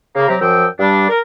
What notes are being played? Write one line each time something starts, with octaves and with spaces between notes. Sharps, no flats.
C#3 A#3
C3 F#3 G4 A#5
F#2 F3 G5 E6
G2 G3 D4
A#4